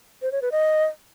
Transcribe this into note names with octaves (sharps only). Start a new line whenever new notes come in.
C5
C#5
B4
D#5